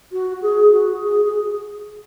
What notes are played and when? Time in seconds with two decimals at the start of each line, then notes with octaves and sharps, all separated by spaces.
0.12 F#4
0.42 G#4
0.73 F#4
1.03 G#4
1.25 G#4